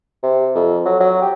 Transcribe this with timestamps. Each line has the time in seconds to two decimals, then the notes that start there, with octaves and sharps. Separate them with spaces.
0.23 C3
0.55 F2
0.85 F#3
1.00 F#3
1.22 G4